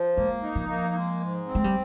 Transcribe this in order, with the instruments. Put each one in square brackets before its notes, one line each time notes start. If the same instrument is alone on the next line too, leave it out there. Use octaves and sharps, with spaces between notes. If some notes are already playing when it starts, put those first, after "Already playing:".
Already playing: [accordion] F3
[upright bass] G#3 [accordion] A#3
[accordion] D#4
[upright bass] F3
[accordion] A#3
G#3
G#2
C4
[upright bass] G#3
G3